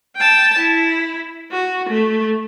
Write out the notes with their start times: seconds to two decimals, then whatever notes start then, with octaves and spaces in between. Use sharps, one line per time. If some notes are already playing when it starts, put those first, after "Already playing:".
0.16 G5 A5
0.58 E4
1.51 F#4
1.89 A3